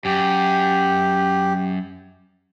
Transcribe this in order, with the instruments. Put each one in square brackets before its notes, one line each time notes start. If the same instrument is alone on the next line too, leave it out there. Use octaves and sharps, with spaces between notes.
[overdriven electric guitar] F#2 [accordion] G4